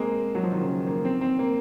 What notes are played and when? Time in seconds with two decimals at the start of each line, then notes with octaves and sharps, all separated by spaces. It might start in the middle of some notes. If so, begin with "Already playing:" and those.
Already playing: G#3 A#3 C4
0.35 F#3
0.43 F3
0.52 D#3
0.61 C#3
0.69 D#3
0.87 A#3
1.05 C4
1.21 C4
1.39 A#3